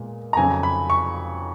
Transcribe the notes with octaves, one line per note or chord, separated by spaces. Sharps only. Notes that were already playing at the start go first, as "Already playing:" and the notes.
Already playing: A#2 G#3 B3
A#5
F2 C#3 F#3 G#5
B5
C#6